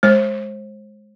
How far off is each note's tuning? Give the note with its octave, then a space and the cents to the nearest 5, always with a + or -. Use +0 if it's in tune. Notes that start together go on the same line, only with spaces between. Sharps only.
G#3 +10 C5 +35